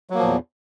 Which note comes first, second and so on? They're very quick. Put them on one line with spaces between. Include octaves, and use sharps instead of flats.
F#3 A#3 F3 A#2 E2